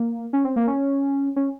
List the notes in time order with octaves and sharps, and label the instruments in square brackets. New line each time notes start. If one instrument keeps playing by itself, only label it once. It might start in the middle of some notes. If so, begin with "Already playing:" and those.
Already playing: [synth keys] A#3
C#4
C4
A#3
C#4
C#4